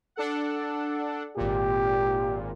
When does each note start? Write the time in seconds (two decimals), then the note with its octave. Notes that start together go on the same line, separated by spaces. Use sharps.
0.16 D4 A4 F#5
1.37 G#1 A#2 G4